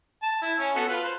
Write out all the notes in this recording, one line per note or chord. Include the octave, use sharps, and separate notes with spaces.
A5
E4
C#4
B3 F#4 A4
F4 B4
B4 C5